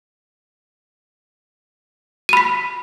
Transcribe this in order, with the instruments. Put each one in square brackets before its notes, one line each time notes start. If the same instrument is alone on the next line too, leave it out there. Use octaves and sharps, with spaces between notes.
[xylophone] D#7
B5
B6